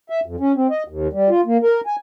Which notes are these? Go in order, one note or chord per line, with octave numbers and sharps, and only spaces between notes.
E5
F2
C#4
C4
D#5
D#2
G3
F4
A#3
A#4
G#5